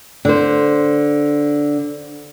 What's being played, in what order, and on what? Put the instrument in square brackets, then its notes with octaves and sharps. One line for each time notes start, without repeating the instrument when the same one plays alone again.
[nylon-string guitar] D3 C5